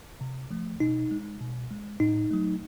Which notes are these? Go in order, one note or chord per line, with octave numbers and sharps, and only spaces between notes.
C3
F3 A3
B2 D#4
G#3
B2
G#3
A2 D#4
F#3 A3